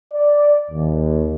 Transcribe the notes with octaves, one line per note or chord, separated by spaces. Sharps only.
D5
D#2